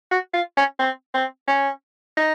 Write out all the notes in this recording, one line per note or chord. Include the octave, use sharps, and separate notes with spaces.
F#4
F4
C#4
C4
C4
C#4
D#4